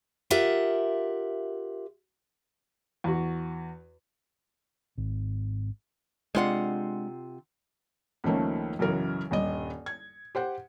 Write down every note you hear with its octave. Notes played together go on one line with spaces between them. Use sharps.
F4 G4 A#4 E5 F#5
E2 F#4
G#1
C3 G#3 C4 D4 F4 F#5
C#2 D#3 F3 A3 A#3 C#4
B1 F#2 C#3 E3 A#4
D#1 G2 D#5
G#6
G4 C5 F#5